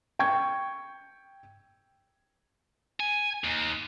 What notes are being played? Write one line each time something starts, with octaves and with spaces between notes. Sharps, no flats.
G5 C#6 G#6
G#5
D#2